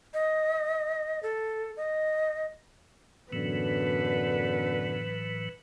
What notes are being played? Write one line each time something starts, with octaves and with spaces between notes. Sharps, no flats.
D#5
A4
D#5
F#2 A2 D3 E3 F#3 B3 B4